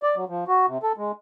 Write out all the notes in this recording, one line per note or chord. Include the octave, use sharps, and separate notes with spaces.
D5
F#3
F3
F#4
C3
A4
G#3